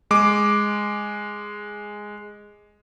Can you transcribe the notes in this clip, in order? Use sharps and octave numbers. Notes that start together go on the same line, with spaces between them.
G#3 D6